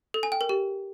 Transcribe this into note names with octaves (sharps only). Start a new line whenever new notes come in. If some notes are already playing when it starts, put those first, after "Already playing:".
A4
G#5
G5
A#4
G4